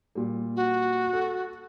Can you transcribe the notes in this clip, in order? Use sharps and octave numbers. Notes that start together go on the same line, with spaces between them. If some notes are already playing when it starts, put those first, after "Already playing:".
A#2 G3
F#4
A4